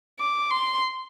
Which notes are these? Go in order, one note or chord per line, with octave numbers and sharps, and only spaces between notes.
D6
C6